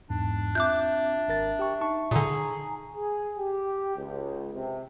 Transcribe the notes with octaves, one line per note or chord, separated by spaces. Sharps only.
E2 G#2 D4
C4 F4 E5 D6 F#6 G6
G#1 A#4 A6
G4 G5 C#6
D#4 A5 C#6
A#2 D3 G#4 G#5 A#5
G#4
G4
C#2
C3